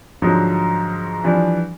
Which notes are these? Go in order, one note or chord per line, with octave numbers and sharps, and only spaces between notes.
G#2 D3 F3 F#3 D#4
E3 F3 G3 D4